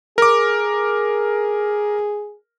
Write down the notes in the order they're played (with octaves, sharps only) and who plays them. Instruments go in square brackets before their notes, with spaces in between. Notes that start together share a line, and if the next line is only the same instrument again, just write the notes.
[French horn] G#4 [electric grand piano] A#4 D6